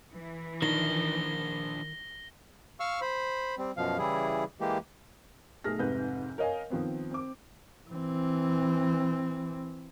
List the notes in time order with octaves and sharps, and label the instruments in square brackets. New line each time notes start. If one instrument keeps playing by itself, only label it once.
[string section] E3
[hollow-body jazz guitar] D#3 [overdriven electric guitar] F3 D4 [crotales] A#6 G7
[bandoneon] F5 C#6 E6 F6
C5 B5
G3 C4
F#2 B2 F3 F5
C#3 E3 G3 E4 G#4
E3 G#3 A#3 G4
[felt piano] B1 A3 G#4 F6 A#6
F1 G#2 C3 B4 G6
A#4 C#5 D#5 F5 G#5
D#3 F3 B3 C4
C4 D6
[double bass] E3 C4